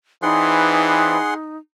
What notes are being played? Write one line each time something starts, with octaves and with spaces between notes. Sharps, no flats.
E3 C4 D#4 G#4 B4 D5 F#5 C6